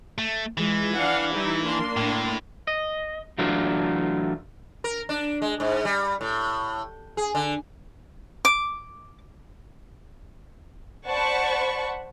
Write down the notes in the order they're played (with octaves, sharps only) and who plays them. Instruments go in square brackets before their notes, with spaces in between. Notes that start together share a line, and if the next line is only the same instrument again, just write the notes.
[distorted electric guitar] A3
[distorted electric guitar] E3 [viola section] G#3 F4
[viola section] D4 F5 F#5
G3 D#4 E4
A#3 D4 C6
[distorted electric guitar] A2
[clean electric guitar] D#5
E3 F#3 A3 D4 F4
[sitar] A#4
D4
G#3
G#2
G3
A2
G#4
D3
[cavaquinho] D6
[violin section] C5 D5 F#5 A5 B5 C#6